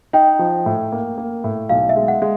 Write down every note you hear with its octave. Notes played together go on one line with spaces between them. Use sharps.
D#4 G5
F3
A2
A#3
A#3
A2
B1 F5
E5
G#3
F#5
G#3